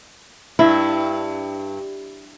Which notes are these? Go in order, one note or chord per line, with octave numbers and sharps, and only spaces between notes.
G2 E4